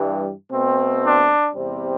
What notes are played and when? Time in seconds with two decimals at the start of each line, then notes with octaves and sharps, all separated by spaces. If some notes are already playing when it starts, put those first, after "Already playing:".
Already playing: G2 E3 G3
0.51 B2 A3 C4
1.03 D4
1.55 E2 C3 G3 C4